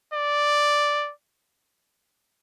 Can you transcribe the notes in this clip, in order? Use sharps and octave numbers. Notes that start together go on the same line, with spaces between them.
D5